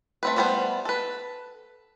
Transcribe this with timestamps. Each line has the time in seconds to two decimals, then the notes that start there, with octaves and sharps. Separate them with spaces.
0.23 A3 C4 B4
0.36 G3 A3 B3 A4 C5
0.85 A4 B4